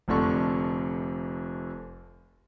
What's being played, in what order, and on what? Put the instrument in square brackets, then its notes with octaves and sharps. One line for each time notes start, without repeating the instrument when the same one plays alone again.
[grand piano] F1 F2 D3 C#6